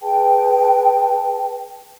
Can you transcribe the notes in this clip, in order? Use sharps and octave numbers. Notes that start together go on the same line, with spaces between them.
G#4 B4 G5 A5